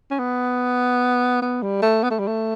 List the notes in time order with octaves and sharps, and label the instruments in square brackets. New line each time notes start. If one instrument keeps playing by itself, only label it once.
[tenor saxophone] C#4
B3
B3
G3
A3
B3
A3
G3
A3